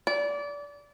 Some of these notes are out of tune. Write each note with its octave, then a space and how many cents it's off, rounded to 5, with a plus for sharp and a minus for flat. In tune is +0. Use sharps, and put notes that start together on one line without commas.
D5 -25